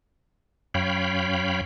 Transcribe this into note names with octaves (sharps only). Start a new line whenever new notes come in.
F#2 C#5 F5 G5 B5